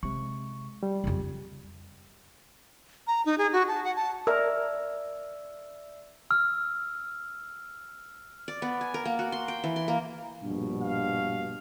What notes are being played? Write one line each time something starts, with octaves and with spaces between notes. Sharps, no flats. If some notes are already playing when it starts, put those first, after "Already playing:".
C3 G#3 C#6
G3
F2 C#3
A#5
D#4
G#4
F#4
A5
F#5
A5
A#4 D5 E5 E6
E6 F6
D5
B3
G#5
A#4
A#3
F#4
C6
G5
E3
C6
A#3
A#1 G2 B2
F5